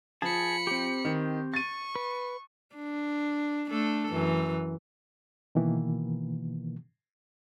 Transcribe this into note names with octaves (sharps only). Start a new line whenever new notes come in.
F3 G#4 A5 B5 C#7
C4 G4
D#3
C#6 A6 D#7
B4
D4
A3 D4 A4
F#2 E3
B2 D#3 E3 A#3